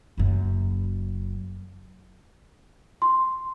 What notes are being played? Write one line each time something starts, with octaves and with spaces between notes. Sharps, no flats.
F#1 F#2
C6